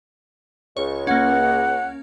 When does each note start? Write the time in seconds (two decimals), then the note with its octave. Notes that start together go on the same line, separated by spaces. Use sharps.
0.77 C#2 C#5
1.07 A#3 C#4 F#5